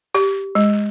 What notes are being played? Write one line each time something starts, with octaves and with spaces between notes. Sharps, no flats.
G4
G#3